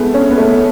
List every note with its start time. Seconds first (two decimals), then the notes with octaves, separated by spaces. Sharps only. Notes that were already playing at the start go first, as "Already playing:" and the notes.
Already playing: G#3 A3 B3
0.14 C#4
0.30 B3
0.38 A3